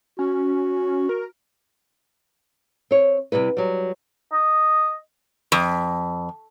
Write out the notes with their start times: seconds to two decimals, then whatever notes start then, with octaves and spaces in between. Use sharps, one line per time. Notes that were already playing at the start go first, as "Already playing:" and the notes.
0.19 C#4 F#4
1.09 A#4
2.91 C4 C#5
3.32 C3 G3 E4 B4
3.57 F#3 G3
4.33 D#5
5.52 F2